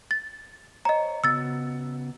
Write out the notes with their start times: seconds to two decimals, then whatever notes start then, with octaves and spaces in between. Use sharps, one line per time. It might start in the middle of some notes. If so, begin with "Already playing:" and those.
0.11 A6
0.85 C5 C#5 D#5 A#5
1.24 C#3 B3 F#4 E6 A6